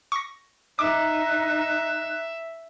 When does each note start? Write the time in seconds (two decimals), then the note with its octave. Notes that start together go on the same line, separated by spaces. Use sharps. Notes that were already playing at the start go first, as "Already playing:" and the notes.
0.12 C#6 A#6
0.79 D#4 E5 D6 F#6